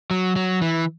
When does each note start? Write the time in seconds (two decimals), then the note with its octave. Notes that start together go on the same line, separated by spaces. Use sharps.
0.11 F#3
0.36 F#3
0.61 E3